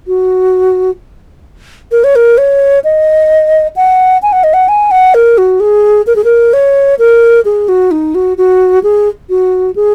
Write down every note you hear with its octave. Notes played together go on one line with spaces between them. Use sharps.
F#4
A#4
C#5
A#4
C#5
D#5
F#5
G#5
F#5
D#5
F#5
G#5
F#5
A#4
F#4
G#4
A#4
G#4
A#4
C#5
A#4
G#4
F#4
D#4
F#4
F#4
G#4
F#4
G#4